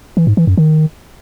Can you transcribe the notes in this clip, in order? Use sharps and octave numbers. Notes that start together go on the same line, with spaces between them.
E3
G#2
E3
F#2
D#3